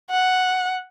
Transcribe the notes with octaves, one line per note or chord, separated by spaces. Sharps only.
F#5